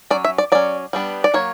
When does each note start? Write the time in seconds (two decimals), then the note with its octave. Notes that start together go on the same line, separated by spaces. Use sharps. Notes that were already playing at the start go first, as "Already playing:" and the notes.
0.10 F#3 C#4 D5
0.25 E5
0.38 D5
0.52 F#3 C#4 D5
0.93 G3 B3 D4
1.24 D5
1.34 F#3 A#3 C#5